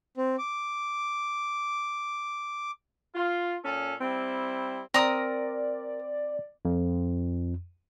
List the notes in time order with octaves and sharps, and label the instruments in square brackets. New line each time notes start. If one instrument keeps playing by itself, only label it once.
[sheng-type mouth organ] C4
D6
[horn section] F4
A#2 C#4 A4
G3 C4 E4
[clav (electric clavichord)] C4 A#5 [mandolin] A#4 D#6 [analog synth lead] D5
[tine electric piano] F2